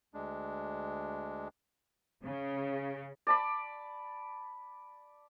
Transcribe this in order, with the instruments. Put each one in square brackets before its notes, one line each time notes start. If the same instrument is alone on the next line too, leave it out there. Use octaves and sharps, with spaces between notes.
[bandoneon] D2 G#3 D4
[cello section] C#3
[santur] D5 A5 B5